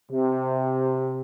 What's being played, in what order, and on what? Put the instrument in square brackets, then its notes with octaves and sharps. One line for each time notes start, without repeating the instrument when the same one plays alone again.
[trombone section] C3